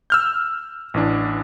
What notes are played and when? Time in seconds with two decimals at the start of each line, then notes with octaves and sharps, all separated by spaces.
0.10 E6 F6 G6
0.94 A1 E3 D4